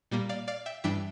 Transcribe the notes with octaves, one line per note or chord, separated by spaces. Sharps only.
A#2 G3 A#3
D5 F5
D5 F5
E5 G5
G2 E3 G3 D4 E5 G5